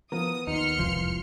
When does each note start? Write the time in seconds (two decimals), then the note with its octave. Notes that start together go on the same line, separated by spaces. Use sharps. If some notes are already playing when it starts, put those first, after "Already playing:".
0.12 E3 F3 B3 A#4 D#6
0.47 D#2 D#4 C6 F6 C#7
0.79 E1 C2 F2 E3 F3